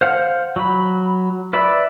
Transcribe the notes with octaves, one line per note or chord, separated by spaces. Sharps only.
C5 F5 F#5
F#3 B5
B4 D5 E5 B5